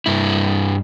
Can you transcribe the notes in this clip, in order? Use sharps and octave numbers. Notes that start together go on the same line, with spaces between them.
G2 E4